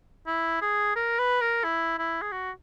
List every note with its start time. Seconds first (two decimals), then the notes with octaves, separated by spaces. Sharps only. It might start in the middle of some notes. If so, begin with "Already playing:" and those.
0.27 E4
0.61 G#4
0.96 A#4
1.19 B4
1.41 A#4
1.64 E4
1.98 E4
2.22 G#4
2.32 F#4